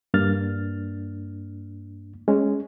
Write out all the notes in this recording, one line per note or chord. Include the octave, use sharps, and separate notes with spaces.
G2 A#3 D4 F6 A6
G#3 C#4